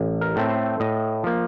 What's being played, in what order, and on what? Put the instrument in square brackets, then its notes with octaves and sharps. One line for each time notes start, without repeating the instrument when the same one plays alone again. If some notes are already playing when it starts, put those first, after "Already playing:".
Already playing: [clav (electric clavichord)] A1
A#4
A2 A3 C4
C5
A2 D#5
F3 A#3